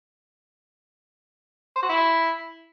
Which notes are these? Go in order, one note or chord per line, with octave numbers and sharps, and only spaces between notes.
C5
F#4
E4